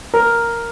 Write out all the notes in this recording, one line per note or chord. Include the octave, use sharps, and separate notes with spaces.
A#4